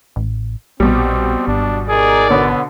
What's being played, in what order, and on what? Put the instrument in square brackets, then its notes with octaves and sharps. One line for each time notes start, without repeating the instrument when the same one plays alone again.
[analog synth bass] A1
[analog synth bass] A#1 [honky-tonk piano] B2 G3 [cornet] C4
[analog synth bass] G#1 [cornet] D4
[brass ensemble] D#4 A#4 D5 [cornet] G#4
[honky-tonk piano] B2 D3 C#5 [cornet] B3